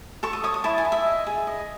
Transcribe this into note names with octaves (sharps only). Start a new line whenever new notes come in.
A4 C#6
D#6
C#5 D#6
D#6
E4 A5
G#5
E4
E5
D#5
G#4
D#5